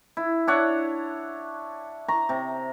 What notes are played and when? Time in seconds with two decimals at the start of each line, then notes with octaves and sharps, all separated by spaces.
0.17 E4
0.47 D4 E4 C#5 F#5
2.08 A#5 C#6
2.29 C3